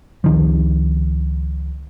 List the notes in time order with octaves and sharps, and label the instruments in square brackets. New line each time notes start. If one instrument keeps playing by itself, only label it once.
[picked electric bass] C#2 D#3 F3